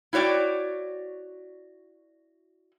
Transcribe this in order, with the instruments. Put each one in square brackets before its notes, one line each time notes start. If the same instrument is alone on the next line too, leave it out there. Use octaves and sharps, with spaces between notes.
[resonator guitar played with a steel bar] E4 F#4 C#5 D5 G5